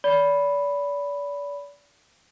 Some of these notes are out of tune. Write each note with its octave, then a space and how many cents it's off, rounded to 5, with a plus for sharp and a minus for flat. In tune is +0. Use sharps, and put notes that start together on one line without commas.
D5 -40 B5 +0